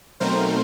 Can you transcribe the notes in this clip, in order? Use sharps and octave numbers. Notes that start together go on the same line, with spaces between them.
B2 F#3 A3 C4 D#4 A#4 C5